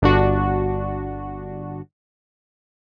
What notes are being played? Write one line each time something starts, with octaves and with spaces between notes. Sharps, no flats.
G1 D4 F#4